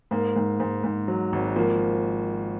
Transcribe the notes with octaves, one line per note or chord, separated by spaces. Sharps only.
G#2 A#3
G#2
G#2
G#2
F#3
G#1
F3 A#3